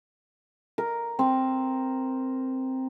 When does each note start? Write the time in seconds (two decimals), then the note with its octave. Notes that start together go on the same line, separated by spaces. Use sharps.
0.78 A#4
1.19 C4